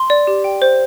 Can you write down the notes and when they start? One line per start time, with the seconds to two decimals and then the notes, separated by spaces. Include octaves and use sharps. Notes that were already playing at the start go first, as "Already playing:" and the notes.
Already playing: C6
0.10 D5
0.27 G4
0.44 G5
0.62 C5